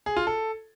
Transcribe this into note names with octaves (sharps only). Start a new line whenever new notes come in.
G#4
F4
A4